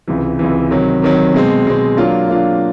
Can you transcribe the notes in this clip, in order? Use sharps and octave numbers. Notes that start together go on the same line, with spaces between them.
C#2 C3 E3
C#2 C3 E3
C3 D#3 F#3
C3 D#3 F#3
B2 G#3 C4
B2 G#3 C4
F#3 A#3 D4 F4
F#3 A#3 D4 F4